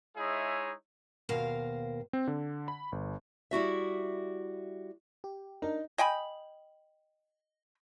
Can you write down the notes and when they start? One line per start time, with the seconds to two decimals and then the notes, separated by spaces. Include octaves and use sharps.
0.17 G#3 D#4 E4 G#4 C#5 E5
1.29 D#2 B2 A#4 C5 F5
2.13 C4
2.28 D3
2.68 B5
2.92 G1
3.51 G3 E4 F#4 E5
5.24 G4
5.62 D4 D#4 A#4
5.98 D#5 G5 G#5 B5